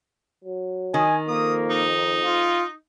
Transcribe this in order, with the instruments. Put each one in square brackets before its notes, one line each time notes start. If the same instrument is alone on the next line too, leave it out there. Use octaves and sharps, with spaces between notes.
[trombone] F#3
[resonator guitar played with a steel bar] D#3 [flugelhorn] G#5
[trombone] F2 [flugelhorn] A#3 [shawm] D#6
[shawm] D#4
[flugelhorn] F4